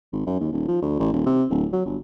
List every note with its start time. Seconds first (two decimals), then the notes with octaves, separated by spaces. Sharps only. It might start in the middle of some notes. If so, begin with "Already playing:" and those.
0.13 G#1
0.27 F#2
0.40 D#2
0.52 D#1
0.68 F3
0.82 D2
0.99 A1
1.13 D#1
1.26 C3
1.50 D1
1.73 F#3
1.86 G1